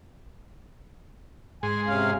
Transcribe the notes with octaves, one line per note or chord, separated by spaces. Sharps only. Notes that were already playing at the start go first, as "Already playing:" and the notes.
G#2 G#4 G#5 C6
C3 C#4 F5